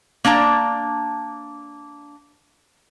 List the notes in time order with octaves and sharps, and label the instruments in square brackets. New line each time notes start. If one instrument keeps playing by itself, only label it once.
[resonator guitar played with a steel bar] A#3 D4 A5 A#5